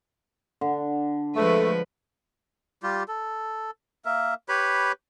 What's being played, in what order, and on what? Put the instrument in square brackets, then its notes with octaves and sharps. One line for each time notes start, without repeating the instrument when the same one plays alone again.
[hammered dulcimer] D3
[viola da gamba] F3 G#3 B4 [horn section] A3
[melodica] G3 F4 G4
A4
A#3 A#4 E5
G4 B4 C#5 B5